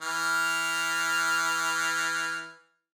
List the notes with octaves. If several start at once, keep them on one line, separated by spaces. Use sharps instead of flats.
E3 F6